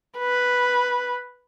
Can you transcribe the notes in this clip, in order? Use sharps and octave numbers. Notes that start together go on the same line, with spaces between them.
B4